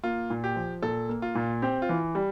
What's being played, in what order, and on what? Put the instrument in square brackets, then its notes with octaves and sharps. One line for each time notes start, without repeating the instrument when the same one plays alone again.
[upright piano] A#3 [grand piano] F4
[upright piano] A#2
[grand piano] G4
[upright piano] F3
[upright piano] A#2 [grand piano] A4
[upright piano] A#3
[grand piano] F4
[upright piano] A#2
[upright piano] C4 [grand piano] G4
[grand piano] F4
[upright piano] E3
G3